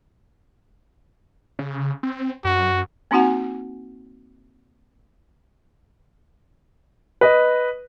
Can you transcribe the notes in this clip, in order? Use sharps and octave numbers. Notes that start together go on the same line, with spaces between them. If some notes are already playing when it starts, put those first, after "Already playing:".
C#3
C4
F#2 F#4
A#3 C4 D#4 F#4 F#5 G#5
B4 D#5